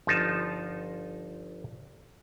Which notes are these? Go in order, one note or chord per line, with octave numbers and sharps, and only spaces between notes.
G1 F3 D#4 F4 A5